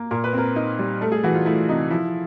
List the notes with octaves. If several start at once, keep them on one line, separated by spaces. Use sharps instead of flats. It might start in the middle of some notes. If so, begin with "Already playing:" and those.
Already playing: A#3
A#2 A#4
B4
C4 A#4
D#4
G3
A3 A4
G#4
E3 F#4
F4
A3 E4
C3 D#4
F3 E4